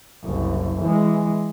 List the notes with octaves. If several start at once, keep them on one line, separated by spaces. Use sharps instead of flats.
F#1 C2
E3 G#3